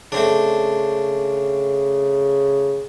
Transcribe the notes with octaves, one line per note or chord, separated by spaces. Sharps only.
C#3 A3 C4 D4